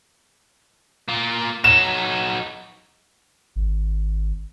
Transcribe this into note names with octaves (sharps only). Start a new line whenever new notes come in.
A#3 F4
F#3 D#4 E7
G#1